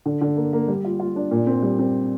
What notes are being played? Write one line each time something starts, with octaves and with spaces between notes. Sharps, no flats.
D3
D3
A#3
A#3
G3
F4
F4
D4
A#2
C4
G3
C4